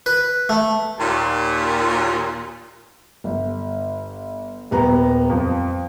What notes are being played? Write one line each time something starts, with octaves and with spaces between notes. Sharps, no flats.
B4
A3
D#2 A#2
G1
D#1 B3 A#5
F2